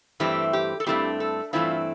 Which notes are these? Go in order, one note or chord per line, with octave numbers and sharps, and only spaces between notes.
G2 E3 A3 C4 E4 G4
G4
A4
G2 E3 A3 C4 E4 G4
A4
G2 E3 A3 C4 E4 F4